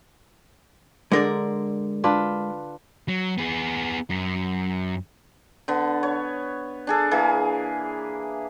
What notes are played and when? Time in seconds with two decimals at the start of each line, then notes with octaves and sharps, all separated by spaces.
1.12 D3 G#3 A#4 D5
2.04 D4 F4 B4
3.08 F#3
3.38 B3 G#4
4.10 F#2
5.68 D3 B3
6.03 C#5
6.87 D4 G#4 A4
7.11 E3 A#3 G#4